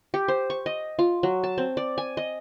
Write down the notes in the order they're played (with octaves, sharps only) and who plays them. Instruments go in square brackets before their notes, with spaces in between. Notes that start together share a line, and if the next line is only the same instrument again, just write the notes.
[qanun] G4
C5
C#6
D#5
F4
F#3
A5
C4
D5
G#5
D#5